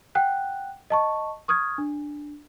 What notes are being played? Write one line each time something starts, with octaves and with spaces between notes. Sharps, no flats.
F#5 G5 F#6
D#5 A5 C#6
C#6 D#6 F6 G#6
D4